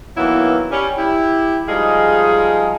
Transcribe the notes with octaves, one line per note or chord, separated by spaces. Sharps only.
D#3 E3 F#3 A#3 B3 E4
G3 C#4
E4 G4
F3 G3 G#3 D#4 G#4 F5